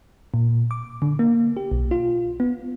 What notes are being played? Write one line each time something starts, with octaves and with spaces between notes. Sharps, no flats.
A#2
D6
D3
A#3
G4
B1
F4
B3